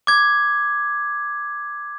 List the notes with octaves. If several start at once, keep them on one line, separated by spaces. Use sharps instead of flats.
D6 G#6